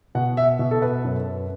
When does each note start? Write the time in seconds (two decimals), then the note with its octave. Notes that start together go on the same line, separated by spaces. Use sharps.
0.15 B2 F#5
0.37 E5
0.59 B2
0.71 A4
0.82 B4
1.04 F#2